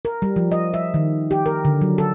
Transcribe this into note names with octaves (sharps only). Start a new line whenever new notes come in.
A#4
G3
F3
D#5
E5
D#3
G4
A#4
D3
F#3
A4